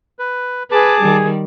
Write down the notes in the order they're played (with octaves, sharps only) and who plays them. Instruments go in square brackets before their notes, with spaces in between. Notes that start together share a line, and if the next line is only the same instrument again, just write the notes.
[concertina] B4
[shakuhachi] G#4 [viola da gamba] B4 [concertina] A5 D6
[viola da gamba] D#3 G3